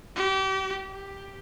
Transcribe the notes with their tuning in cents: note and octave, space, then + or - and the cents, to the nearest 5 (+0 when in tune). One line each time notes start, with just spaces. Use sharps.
G4 -30
G4 +5